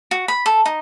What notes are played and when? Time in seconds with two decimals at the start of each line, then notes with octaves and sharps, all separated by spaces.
0.11 F#4
0.28 B5
0.46 A4
0.66 D#4